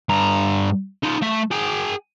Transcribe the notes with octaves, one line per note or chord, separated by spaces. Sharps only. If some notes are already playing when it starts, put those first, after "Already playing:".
G2 A#5
D#4 F4
A3 E5
G#4 G5